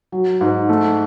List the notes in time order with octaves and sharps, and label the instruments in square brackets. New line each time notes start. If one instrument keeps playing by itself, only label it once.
[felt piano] F#3
G#2
A3